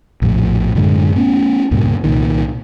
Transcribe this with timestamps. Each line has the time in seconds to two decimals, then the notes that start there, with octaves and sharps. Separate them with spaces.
0.22 A#1 F2 A2
0.75 F#2 A2 D3 G#3
1.15 A3 B3 C#4
1.71 C#2 G2 A#2
2.04 C2 A#2 D#3